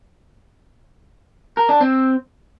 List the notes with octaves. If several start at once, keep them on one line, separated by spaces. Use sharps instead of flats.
A#4
D4
C4